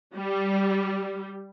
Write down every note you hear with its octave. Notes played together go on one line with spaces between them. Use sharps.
G3